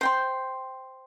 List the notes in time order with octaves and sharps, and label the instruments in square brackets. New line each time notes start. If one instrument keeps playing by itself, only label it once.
[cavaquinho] C5 G5 C6